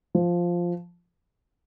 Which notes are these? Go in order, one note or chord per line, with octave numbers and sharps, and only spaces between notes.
F3